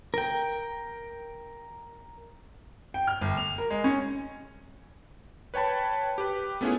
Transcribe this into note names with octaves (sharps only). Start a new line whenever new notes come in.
A#4 G5
G5
F6
G1
F7
A#4
G#3
C#4
B4 C#5 G5 A5 B5
G4 B4
A3 B3 C#4 E4 F4 G#4